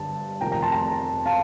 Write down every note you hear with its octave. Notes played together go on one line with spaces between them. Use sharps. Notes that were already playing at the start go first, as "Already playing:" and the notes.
Already playing: G2 D3 A5
F1 F2 D#3 G5 A#5
G5 A#5
A5 C6
G5 A#5
F5 A5